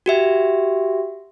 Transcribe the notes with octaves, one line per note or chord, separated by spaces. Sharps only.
F#4 G4 E5